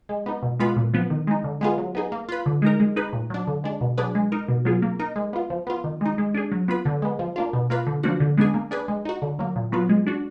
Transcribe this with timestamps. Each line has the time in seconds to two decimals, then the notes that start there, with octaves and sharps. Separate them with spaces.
0.09 G#3
0.26 B3 D#4
0.43 B2
0.60 G#3 B3 F4 B4
0.76 A#2
0.94 F3 B3
1.10 D#3
1.27 G#3 D#4
1.44 D3
1.61 G#3 B3 F4 G#4
1.78 F#3
1.95 B3 D#4 G#4
2.12 A#3
2.29 F4 B4
2.46 D3
2.62 G#3 D#4 A#4
2.80 G#3
2.96 D#4 G#4 B4
3.13 A#2
3.30 F#3 D4
3.47 D3
3.64 G#3 D4
3.81 B2
3.98 F#3 D4 G#4 B4
4.15 G#3
4.32 D#4 A#4
4.48 B2
4.65 F#3 B3 F4 G#4
4.82 A#3
4.99 D#4 A#4
5.16 G#3
5.33 B3 F4
5.50 F3
5.67 B3 F4
5.84 D#3
6.01 G#3 D#4
6.18 G#3
6.34 D4 G#4
6.52 F#3
6.68 B3 F4 B4
6.85 D3
7.02 G#3 B3
7.19 F3
7.36 A#3 D4 F4
7.53 B2
7.70 A#3 F4 B4
7.87 D3
8.03 F3 A#3 D4 F#4
8.20 D3
8.37 G#3 B3 D4 G#4
8.54 A#3
8.71 D4 G#4 B4
8.88 G#3
9.05 D#4 F#4
9.22 D3
9.39 F#3 A#3
9.56 A#2
9.72 F#3 B3 F4 B4
9.89 G#3
10.07 D4 F#4